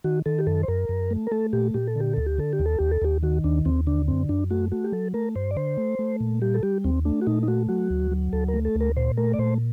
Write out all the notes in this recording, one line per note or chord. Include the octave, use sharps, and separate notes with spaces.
D#3 F#4
D#3 A4
G4
F#2 A4
C5
F#2 A#4
F#2
A3
A#4
A3 A4
A#2 G4
A#2 G4
A4
D3 G4
D2 A4
G4
D3 A4
G4
D#2
A4
D#2 G4
A4
D#2 G4
D#3 F#4
D#2 D4
D#2 C4
D3 D4
F#2 C4
F#2 D4
A3 F#4
A3 F#4
G4
F#3 A4
A3 A#4
G2 C5
D5
D3 C5
A3
A3
A#2
G3 G4
A4
G3 G4
D#2 C4
A3 D4
F#4
A#2 D#4
D#4
A3 F#4
F#3 F#4
D2
F#3
D2 A4
A#4
A3
A4
D2
A#4
A#2 C5
A3 A#4
D5
A#2 C5